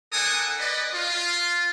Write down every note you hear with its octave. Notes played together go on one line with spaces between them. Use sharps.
D4 A4 A#4 F#5 G#5 D#6
B4 D5 D#5
F4